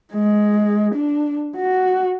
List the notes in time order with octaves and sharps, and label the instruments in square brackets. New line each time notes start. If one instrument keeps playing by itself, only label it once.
[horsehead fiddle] G#3
D4
F#4